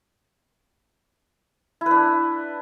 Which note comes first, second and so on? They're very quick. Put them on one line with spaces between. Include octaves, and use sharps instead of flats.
E4 B4 D4